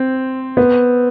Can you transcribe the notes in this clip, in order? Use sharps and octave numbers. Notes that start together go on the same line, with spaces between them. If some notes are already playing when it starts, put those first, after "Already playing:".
Already playing: C4
B3